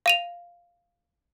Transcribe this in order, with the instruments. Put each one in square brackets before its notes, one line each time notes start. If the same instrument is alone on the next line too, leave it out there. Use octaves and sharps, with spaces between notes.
[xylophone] F5 D#7 F7